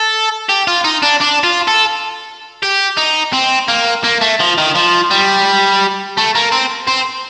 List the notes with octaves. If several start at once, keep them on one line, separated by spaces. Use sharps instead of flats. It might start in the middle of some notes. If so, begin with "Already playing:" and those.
Already playing: A4
G4
F4
D#4
D4
D4
F4
A4
G4
D#4
C4
A#3
A#3
A3
F3
D#3
F3
G3
A3
A#3
C4
C4